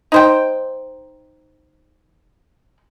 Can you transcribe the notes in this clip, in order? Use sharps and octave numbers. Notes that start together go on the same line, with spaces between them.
D#4 C5 G5